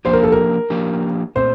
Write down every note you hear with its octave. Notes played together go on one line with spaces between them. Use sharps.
F3 A#3 D4 G4 C5
A#4
A4
A#4
F3 A#3 D4 G4
A#2 A3 C4 C5